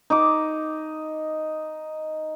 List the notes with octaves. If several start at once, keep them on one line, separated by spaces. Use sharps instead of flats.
D#4 D6